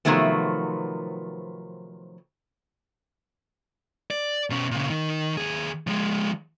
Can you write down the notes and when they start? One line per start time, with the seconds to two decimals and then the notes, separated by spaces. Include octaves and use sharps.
0.05 C3 D#3 F3 F#3 A3 B3
4.11 D5
4.50 B2 C#4
4.71 A#2 C#3
4.90 D#3
5.37 D#2 G#4
5.87 F3 G#3